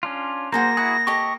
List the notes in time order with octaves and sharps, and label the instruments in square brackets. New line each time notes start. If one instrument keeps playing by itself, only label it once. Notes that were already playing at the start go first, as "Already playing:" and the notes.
[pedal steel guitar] C#4 D4 F4
[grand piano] A#3 [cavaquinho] F#4 G#4 D5 [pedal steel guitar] C5 [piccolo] A#6
[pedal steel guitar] E4 F#4 G#4 [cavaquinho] F#5
[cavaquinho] G4 A4 D#5 [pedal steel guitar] C#6